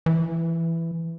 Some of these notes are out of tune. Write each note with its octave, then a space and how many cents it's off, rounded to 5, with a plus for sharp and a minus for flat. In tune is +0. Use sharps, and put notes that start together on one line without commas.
E3 +10